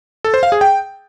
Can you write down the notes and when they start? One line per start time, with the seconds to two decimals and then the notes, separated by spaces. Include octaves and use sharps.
0.24 A4
0.34 C5
0.43 F5
0.52 G#4
0.61 G5